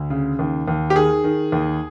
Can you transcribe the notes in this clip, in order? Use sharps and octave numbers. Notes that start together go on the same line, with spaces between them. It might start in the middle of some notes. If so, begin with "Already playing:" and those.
Already playing: D2
C#3
D#2
D#2
G4
D#3 G#4
D#3
D#2